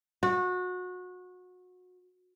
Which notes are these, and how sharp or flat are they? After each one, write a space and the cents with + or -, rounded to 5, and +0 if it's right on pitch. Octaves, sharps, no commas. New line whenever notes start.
F#4 -25